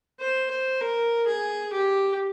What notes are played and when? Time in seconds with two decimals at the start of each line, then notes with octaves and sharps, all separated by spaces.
0.20 C5
0.50 C5
0.81 A#4
1.27 G#4
1.73 G4